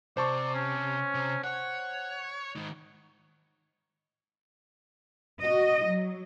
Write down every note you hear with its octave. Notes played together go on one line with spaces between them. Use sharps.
C3 C5 D5 A5 C#6
C#4
C3
C#5 F#5
G#2 D#3
F#4 D#5
F#3